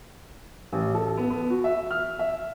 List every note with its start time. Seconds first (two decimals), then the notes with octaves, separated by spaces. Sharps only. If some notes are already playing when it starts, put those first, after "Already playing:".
0.73 A1
0.94 A4
1.17 B3
1.30 B3
1.50 F#4
1.64 E5
1.91 F6
2.19 E5